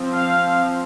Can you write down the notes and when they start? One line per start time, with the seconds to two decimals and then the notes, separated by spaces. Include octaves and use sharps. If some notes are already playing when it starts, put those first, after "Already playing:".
Already playing: F3 C4
0.15 F5